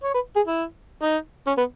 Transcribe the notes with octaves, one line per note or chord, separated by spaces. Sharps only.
C#5
B4
G#4
E4
D#4
C#4
B3